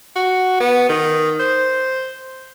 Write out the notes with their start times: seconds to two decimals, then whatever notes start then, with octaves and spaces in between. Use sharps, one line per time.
0.16 F#4
0.60 B3
0.89 D#3
1.40 C5